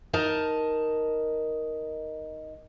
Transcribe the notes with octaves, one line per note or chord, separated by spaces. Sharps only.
D#4 A#4 D#5 A5